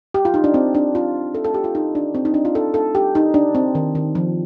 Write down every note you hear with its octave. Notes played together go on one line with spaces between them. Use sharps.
G4
F4
D#4
D4
C4
D4
F4
A4
A4
G4
F4
D#4
D4
C4
D#4
D4
F4
A4
A4
G4
D#4
D4
C4
D#3
D#3
F3